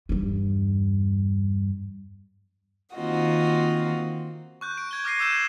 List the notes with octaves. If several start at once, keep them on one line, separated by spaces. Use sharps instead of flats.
E2 G2
D#3 A#3 C4 F4 F#4 D#5
C#6 F#6 G6
D7
G6 G#6 G7
D6 F6 A#6 C7 D#7
D6 E6 G6 E7 G7
G6 G#6